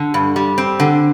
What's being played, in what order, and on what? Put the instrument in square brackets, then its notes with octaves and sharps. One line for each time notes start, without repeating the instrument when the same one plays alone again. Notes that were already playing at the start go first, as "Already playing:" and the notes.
Already playing: [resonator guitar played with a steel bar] D3
G2
G3
C4
D3